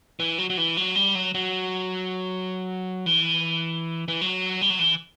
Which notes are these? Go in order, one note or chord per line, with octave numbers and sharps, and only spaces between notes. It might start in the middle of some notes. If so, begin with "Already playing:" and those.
E3
F#3
F#3
E3
F#3
G3
F#3
F#3
E3
E3
F#3
G3
F#3
E3